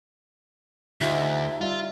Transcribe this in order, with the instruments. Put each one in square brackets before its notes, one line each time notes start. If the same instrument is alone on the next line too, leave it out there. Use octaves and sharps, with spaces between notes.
[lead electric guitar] D2 [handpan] D#4 F4 G4 [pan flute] E5
[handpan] G3 D5 E5 [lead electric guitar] F4